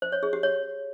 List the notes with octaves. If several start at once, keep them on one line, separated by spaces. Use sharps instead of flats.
C5
C#5
G#4
G4
C#5